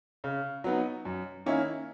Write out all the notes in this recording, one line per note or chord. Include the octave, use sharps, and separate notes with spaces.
C#3
F#3 B3 D#4
F#2
D#3 A#3 C#4 E4